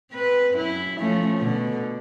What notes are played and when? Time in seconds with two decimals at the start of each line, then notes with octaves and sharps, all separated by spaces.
0.12 C4 B4
0.54 F#2 E4
0.99 F3 A3 C#4
1.38 B2 D3